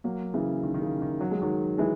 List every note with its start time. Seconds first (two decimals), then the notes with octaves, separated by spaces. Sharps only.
0.04 F#3 A#3
0.34 C#3 E3
0.63 D#3
0.74 D#3
0.82 C#3
1.02 D#3
1.21 F#3
1.31 G#3
1.42 D#3 F#3
1.78 E3 G#3